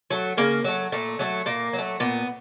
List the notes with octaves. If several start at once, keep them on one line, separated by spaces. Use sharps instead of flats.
F#3 A3
C#3 A#3
F#3 A3
A#2 A3
F#3 A3
A#2 A#3
F#3
A3
A#2 B3